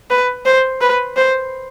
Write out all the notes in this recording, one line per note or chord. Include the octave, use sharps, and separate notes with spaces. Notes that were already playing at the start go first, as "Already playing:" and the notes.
B4
C5
B4
C5